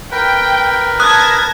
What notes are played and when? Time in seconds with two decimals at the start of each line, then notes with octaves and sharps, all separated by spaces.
0.12 A#4 B4 G5
1.00 A5 D#6 F#6 G#6 A#6